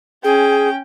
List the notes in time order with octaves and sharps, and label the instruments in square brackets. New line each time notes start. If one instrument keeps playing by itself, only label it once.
[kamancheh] C#4 G5 [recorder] G#4